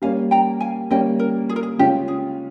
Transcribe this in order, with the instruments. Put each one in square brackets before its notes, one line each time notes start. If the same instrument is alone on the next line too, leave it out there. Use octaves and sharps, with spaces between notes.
[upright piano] G3 A#3 C#4 [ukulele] F5 G#5
[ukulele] G5 A#5
F5 G#5
[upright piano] G3 A#3 C#4 [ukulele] D#5 G5
[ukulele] A#4
G#4
A#4
G#4
[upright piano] C#3 G#3 C#4 F4 [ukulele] G4
[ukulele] G#4